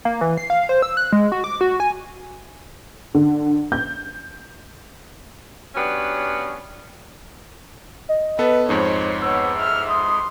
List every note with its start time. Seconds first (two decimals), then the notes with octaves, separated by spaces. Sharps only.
0.05 A#3
0.21 E3
0.37 C7
0.50 F5
0.69 C5
0.82 E6
0.97 F#6
1.12 G#3
1.32 F#4
1.44 D6
1.61 F#4
1.80 G#5
3.15 D3
3.72 G6
5.75 F#3 B3 C#4 D4 G4
8.09 D#5
8.39 B3 A4 B4
8.69 F2 G#2 D#4 C5 C#5
9.21 B3 C#5 E6
9.58 E5 F6
9.89 C6 D#6